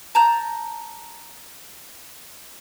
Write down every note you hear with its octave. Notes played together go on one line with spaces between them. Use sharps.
A5 A#5 G6